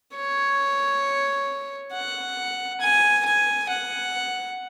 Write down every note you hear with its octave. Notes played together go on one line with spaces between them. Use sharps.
C#5
F#5
G#5
G#5
F#5